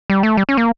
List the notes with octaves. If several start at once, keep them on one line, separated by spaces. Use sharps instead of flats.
G3
A3
G3
C#4
A#3